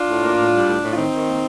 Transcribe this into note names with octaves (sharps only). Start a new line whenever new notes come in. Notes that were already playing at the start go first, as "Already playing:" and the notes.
Already playing: D4 F4
A2
A#3
A2
G3
A2
A2
F4
D#3 C4 D#4
D#3
A#3